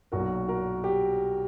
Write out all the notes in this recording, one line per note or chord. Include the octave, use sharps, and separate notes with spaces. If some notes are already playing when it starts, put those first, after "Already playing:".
B1 A#2 F#3 F#4 A#4
F#4 A#4
G4